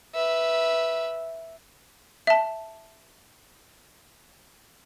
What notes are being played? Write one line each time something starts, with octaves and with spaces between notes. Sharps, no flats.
B4 E5
E5 A5